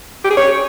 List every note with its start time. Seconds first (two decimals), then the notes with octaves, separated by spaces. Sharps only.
0.24 G4
0.31 G#4
0.37 C#5